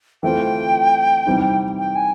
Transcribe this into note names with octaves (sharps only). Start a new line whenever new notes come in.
E3 A3 C4 F4 G5
C3 E3 G3 C4 D#4
G5
G#5